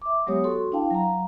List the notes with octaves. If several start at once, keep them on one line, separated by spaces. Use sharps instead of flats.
E5 D6
F#3 G#3 B3 G4 C#5 D#6
F#4 A4 C6 C#6
D4 E4 F5 G5 A5
F#3 F5 A#5